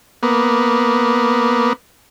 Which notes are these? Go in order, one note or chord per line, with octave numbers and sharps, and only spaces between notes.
A#3 B3